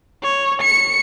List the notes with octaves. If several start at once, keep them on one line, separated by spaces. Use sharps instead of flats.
C#5
C#7